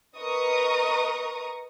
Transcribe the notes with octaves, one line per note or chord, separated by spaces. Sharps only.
A#4 B4 D#5 A#5 C#6 D#6